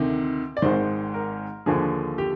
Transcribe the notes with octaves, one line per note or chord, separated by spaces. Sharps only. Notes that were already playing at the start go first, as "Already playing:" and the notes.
Already playing: D2 C3 D#3
D5
G#1 G#2 D#3 C5
A#4
D#2 D3 F3 G#4
G4